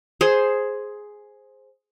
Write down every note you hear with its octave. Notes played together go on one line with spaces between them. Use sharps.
G#4 C5